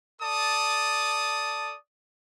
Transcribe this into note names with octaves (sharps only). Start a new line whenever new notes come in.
A4 D5 A5 D#6